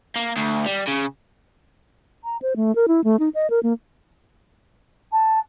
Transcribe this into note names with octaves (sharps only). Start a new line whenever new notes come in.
A#3
D2
G3
C#3
A#5
C5
A3
A#4
E4
A3
D#4
D#5
A#4
A#3
A5